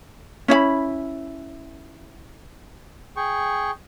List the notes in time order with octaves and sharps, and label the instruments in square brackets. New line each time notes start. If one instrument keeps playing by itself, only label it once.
[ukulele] C#4 E4 D#5 B5
[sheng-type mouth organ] G#4 G5 C#6